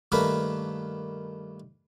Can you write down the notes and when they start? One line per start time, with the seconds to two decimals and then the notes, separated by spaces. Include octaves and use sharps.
0.12 G2 D#3 A3 A#3 A#4 B4